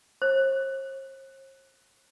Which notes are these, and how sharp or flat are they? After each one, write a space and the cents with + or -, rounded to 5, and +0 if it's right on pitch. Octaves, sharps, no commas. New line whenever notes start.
C5 +45